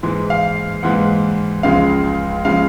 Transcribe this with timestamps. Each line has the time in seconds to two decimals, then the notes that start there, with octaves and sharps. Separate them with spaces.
0.03 G#2 E3 G#3
0.30 F5
0.83 G#2 E3 G#3 F#5
1.63 C#2 C#3 F3 G#3 F5
2.45 C#3 F3 G#3 F5